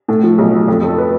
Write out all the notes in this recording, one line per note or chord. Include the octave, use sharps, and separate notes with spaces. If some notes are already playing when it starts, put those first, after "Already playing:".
A2 A4
F3
B1 G#4
F3
F2 A4
A3
A4
B4